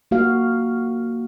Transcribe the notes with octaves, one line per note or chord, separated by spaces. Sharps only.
A#3 F#4 F5